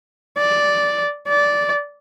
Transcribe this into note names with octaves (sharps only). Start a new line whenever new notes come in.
D5
D5